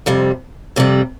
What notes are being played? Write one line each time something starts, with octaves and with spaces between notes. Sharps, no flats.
F2 C3 G3
F2 C3 G3